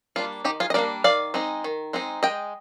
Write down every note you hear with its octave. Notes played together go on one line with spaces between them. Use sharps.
G3 A#3 D4 F4
D#3 D#4 G4
F4 G#4
D#5
G3 A#3 D4 A#4 D5
D#3 D5 F5
G#3 C4 D#4
D#3
G#3 C4 D#4
G#3 D#5 G5